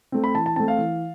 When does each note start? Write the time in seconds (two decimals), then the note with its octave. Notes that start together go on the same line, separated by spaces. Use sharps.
0.12 A3 C4
0.24 B5
0.35 E3 A5
0.46 A5
0.56 A3 C4 A5
0.68 F5
0.78 E3